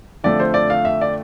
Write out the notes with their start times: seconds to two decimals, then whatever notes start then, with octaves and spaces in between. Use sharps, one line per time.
0.24 F2 D3 F3 A3 D5
0.40 C5
0.54 D5
0.70 F5
0.85 E5
1.01 D5